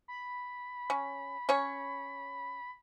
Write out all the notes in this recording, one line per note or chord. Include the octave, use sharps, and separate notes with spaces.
B5
C#4
C#4 C#5